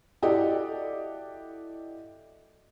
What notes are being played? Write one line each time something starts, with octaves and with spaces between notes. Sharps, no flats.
E4 F#4 G4 A4 D5 D#5